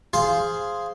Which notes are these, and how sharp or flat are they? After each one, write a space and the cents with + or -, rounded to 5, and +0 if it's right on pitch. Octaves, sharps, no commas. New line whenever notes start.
G#4 +0 C5 +0 F5 -10